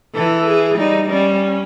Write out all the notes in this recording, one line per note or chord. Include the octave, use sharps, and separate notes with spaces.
E3 A4
G#4
G3 D#4
G3 C#4